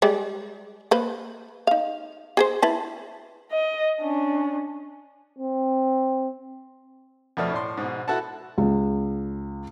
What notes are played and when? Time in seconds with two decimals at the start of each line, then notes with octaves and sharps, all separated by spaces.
0.02 G3 G#3 D5
0.91 A#3 B4 C5
1.67 D#4 F5
2.37 G#4 A#4 C5
2.62 E4 B4 A5
3.52 D#5
4.01 C#4 D4
5.39 C4
7.37 F2 B2 A3 B3 D5 F6
7.51 A2 D5 C6
7.77 G#2 B2
8.08 E4 F#4 A4 B4 F#5 A5
8.58 C#2